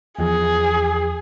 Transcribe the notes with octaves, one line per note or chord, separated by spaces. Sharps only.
E2 F3 G#4